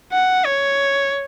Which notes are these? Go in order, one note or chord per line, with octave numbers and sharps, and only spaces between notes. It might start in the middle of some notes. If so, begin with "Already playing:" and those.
F#5
C#5